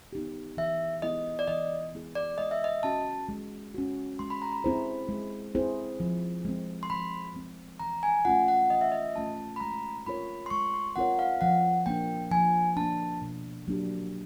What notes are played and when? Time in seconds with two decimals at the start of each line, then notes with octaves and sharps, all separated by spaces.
0.13 B3 D#4 G4
0.57 E3 E5
1.02 G#3 B3 E4 G#4 D#5
1.39 D5
1.47 E3 D#5
1.93 G#3 B3 E4 G#4
2.15 D5
2.38 G#3 D#5
2.51 E5
2.64 D#5
2.83 C#4 F#4 A5
3.29 G#3
3.74 C#4 F#4
4.19 G#3 C6
4.30 B5
4.42 A#5
4.53 B5
4.64 C4 E4 G#4 C5
5.09 G#3
5.55 C4 E4 G#4 C5
6.00 F3
6.45 G#3 C4
6.83 C6
6.90 F3 B5
7.35 G#3 C4
7.80 E3 A#5
8.03 G#5
8.25 A3 C#4 F4 F#5
8.48 F#5
8.70 E3 D#5
8.81 E5
8.92 D#5
9.16 A3 C#4 F4 A5
9.56 B5
9.60 G#3 A#5
10.06 C4 F4 A#4 C#5 B5
10.46 C6
10.50 G#3 C#6
10.74 C6
10.96 C4 F4 A#4 C#5 F#5
11.19 F5
11.41 F3 F#5
11.86 A#3 D4 G5
12.31 F3 G#5
12.77 A#3 D4 A5
13.21 B2
13.68 F#3 A#3 D4 G4